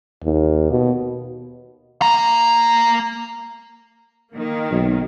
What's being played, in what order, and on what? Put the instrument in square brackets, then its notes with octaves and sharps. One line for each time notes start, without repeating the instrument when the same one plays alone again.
[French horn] D#2
B2
[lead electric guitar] A#3 A#5
[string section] D#3 A#3
[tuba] B1